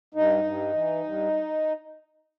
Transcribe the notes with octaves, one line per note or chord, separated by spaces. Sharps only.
G2 D#4
G2
E3
G2